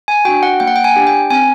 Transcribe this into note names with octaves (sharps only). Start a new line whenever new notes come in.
G#5
D4 F#4 G5
F#5
A#3 G5
F#5
G5
G#5
D4 G4
G5
C4 G#5